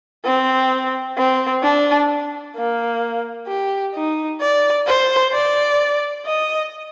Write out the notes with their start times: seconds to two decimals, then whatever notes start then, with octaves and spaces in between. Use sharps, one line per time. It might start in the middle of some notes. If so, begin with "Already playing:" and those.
0.25 C4
1.18 C4
1.63 D4
2.55 A#3
3.48 G4
3.95 D#4
4.40 D5
4.87 C5
5.33 D5
6.26 D#5